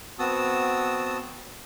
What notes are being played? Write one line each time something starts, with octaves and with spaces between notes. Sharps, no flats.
B3 C4 F#4 A5 D#6 E6